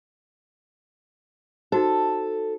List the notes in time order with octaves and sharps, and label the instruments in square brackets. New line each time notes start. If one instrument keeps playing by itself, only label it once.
[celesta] D#4 F#4 C5 [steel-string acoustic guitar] A4